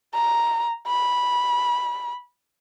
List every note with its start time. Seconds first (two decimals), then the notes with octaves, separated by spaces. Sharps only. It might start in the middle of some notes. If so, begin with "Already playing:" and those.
0.14 A#5
0.87 B5